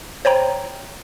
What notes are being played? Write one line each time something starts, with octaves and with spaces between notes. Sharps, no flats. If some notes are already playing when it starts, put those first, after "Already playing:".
C5 C#5 G5 A#5